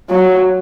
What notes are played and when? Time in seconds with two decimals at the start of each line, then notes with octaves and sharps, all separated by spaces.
0.10 F#3